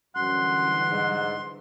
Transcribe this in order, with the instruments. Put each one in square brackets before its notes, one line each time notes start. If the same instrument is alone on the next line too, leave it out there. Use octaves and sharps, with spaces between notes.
[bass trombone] F#2 [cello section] D3 E3 G3 [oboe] F#5 [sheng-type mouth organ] C6
[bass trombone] G#2